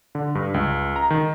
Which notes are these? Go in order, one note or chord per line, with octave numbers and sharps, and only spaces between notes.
D3
G2
C#2
A#5
D#3